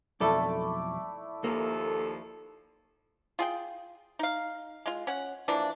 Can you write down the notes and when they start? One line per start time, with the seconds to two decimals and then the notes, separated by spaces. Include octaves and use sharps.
0.20 B1 F2 A3 E4 A4 D5
1.44 D#2 F3 A#3 A4
3.39 F4 G#4 G5
4.19 D#4 F5
4.86 G#3 F4
5.07 C#4 F#5
5.48 E3 F3 A#3 D4